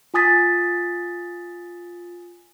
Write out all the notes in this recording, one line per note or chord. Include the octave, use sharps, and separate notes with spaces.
F4 G#5 D#6 A6 B6